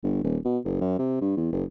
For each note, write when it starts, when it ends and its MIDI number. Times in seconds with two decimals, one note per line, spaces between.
0.03 0.24 31
0.24 0.37 27
0.45 0.58 47
0.65 0.77 30
0.81 0.94 42
0.98 1.17 48
1.21 1.33 43
1.37 1.49 40
1.52 1.64 30